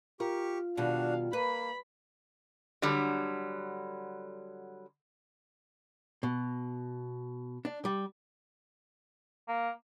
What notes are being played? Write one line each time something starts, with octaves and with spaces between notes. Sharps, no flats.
F4 G4 A#4 C#6
B2 D#3 G3 D4 F#4 F5
A#3 B4 B5
D3 F#3 G3
B2
D4
G3
A#3